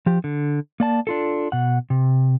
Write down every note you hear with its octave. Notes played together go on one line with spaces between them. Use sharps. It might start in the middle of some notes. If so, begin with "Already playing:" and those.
F3 G4
D3
A#3 D5 A5
D4 F4 A4
B2 F#5
C3